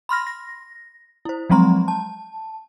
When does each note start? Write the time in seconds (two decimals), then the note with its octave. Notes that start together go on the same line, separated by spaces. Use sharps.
0.09 B5 C6 F6 A#6
0.27 A#6
1.25 E4 C5
1.50 F3 F#3 G#3 C4 A#5 C6
1.88 A5